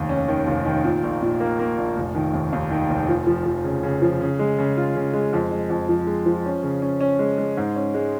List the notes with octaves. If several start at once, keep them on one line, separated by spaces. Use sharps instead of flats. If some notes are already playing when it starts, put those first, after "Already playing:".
Already playing: F1 D#2
C#4
D#3
F1
D#3
A#2
A#1
A#2
A#3
A#3
A#1
F1
D#3
D#2
D#2
D#3
F1
F3
F3
F3
C#3
C#3
F3
C#3
G#3
C#3
F4
C#3
G#3
F2
G#3
F2
F3
G#3
F3
C#4
C#3
C#4
C#4
G#3
G#3
G#2
C#4
G#3